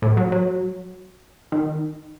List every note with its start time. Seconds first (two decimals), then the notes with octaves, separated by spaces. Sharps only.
0.02 A2
0.17 F#3
0.32 F#3
1.52 D#3